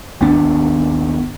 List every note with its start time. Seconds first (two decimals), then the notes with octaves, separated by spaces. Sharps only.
0.21 G#1 D#2 B3 D4